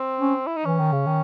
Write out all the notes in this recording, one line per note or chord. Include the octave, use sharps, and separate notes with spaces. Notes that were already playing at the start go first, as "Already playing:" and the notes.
Already playing: C4
C#4
E4
D#4
E3 C#4
D#3
C#3
D#3